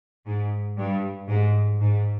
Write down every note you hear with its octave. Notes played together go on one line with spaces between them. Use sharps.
G#2
G2
G#2
G#2